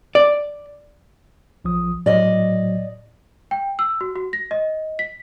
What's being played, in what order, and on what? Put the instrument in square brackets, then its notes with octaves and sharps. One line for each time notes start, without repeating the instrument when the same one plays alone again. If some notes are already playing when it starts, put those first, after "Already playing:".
[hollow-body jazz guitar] D5
[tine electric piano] A#1 F3 D#6
[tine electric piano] A2 F#3 [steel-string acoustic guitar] D5 D#5
[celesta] G5
E6
F#4
F#4
A#6
D#5
B6